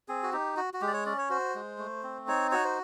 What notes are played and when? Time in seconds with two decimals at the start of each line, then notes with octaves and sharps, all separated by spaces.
0.08 C4 G#4
0.23 F#4
0.33 D#4 G4
0.57 F#4
0.74 F#4
0.81 G#3 G4
0.87 D5
0.93 C#5
1.06 C#4 D5
1.18 C#5
1.30 F#4 C5
1.55 G#3
1.78 A3
2.03 C4
2.28 D#4 C#5
2.51 F#4 C#5
2.64 C5